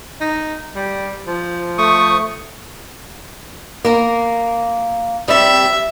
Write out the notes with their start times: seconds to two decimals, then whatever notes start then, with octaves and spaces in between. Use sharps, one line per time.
0.21 D#4
0.75 G3
1.27 F3
1.78 A3 C#6 D#6
3.85 A#3 A#4
5.28 C3 G3 E5